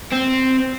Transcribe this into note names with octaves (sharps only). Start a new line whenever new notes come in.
C4